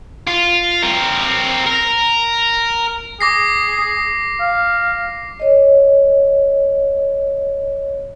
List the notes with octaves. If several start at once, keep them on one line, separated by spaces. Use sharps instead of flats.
F4
C4 A#4
A#4
G#4 D6 A#6 C7
F5
C#5 D#5